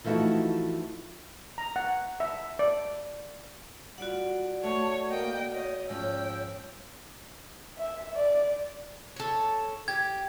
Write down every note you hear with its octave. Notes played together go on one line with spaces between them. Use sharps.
E3 F3 A3 D#4 E4 F#4
A#5
F#5
E5
D5
G3 F4 F#4 D5 F#5
A3 C#5 A5
A#3 D#5 G5
C#5 D#5
G#2 F3 C#4 G5 E6
E5
D5
A4 C#5
G4 G#6